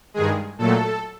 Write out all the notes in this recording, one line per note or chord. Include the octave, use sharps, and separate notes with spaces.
G2 D#3 G#3 G#4
A#2 F#3 A3 A4